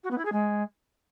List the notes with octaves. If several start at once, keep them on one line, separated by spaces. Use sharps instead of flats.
F#4
B3
E4
G#4
G#3